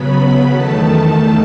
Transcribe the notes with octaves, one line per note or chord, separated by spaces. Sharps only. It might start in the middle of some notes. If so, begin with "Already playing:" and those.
Already playing: C#3 F#3 B3 B5
E2 D#3 A3 A5